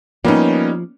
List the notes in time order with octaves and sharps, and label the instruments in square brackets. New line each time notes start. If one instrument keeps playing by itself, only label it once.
[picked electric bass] F3 [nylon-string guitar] G3 D#4 [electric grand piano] A#3 B3 C#4